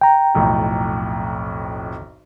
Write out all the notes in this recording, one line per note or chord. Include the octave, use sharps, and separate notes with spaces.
G5 A#5
B1 F2 A2